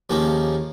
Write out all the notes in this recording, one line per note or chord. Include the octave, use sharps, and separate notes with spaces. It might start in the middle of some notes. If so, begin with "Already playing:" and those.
D#2 C#3 F3 A#3 C#4